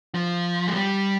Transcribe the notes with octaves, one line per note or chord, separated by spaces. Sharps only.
F3
G#3
G3